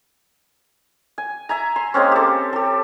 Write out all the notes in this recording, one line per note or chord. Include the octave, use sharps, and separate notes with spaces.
G#5
E5 G#5 A#5
C6
G#3 A#3 C4 C#4
G4 A4
G4 A4